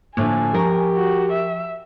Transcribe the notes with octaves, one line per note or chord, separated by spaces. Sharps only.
A2 D3 F3 A#3 G#5
F3 G4 A#4 C#6
F#4
E5